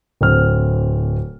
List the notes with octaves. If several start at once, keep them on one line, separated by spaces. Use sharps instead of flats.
D1 C4 F6